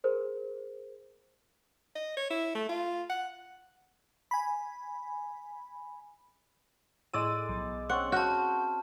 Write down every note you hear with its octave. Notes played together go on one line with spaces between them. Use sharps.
G#4 A#4 C5
D#5
C#5
E4
A3
F4
F#5
G#5 B5
A2 G#3 D5 E6 D#7
B1
C4 C#4 F#5 C#6
F#4 A5 F6 G6